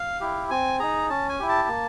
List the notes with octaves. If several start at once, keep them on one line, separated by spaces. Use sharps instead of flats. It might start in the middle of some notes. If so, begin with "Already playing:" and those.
Already playing: F5
E4 G4
C4 G#5
D#4 G#4 A#5
C#4 A5
G#5
E4 G4
A5
A#3